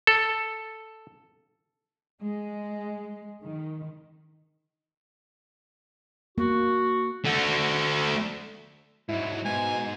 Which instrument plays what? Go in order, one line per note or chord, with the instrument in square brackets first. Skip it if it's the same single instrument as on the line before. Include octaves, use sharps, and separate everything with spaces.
[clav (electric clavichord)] A4
[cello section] G#3
D#3
[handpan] A#3 [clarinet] F#4
[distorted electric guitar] A3 F#4
[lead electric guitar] G#2 F#3 [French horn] E4
[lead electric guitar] G#2 [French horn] B2 [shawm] G#5